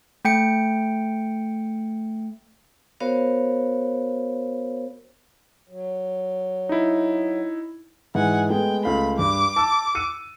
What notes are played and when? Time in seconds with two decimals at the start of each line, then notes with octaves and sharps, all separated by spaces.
0.25 A3 G5 C#7
3.00 B3 F#4 A#4 C5 C#5 F5
5.69 F#3
6.69 D#4 E4
8.15 G#2 E3 F#5 G#5
8.50 G#3 A3 B3 G5
8.85 C#2 A3 F5 B5
9.19 G2 D6
9.56 A5 E6
9.95 E6 C#7 D#7